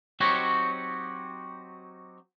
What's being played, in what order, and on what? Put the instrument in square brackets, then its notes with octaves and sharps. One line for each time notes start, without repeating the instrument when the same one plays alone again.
[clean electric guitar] F#3 C4 D#4 F#4 G4 C#5